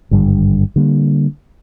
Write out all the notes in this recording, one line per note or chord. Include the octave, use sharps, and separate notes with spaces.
G#1 G2 D3 G3
D3 G3 A#3